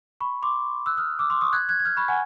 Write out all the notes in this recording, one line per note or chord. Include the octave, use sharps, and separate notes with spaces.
B5 C#6
C6 D6
E6 F#6
D#6 F6
D6 E6
C6 D6
C#6 D#6
F#6 G#6
F#6 G#6
G#6
F6 G6
B5 C#6
F#5 G#5